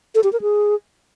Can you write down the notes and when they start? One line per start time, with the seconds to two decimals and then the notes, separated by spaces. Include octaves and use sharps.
0.15 A4
0.24 G4
0.33 A#4
0.41 G#4